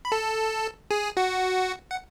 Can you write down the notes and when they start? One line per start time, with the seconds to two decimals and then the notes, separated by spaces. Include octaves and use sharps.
0.05 B5
0.12 A4 A5
0.91 G#4 G#5
1.17 F#4 F#5
1.90 F#5